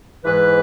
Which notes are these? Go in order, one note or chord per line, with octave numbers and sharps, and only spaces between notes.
G#2 E3 B4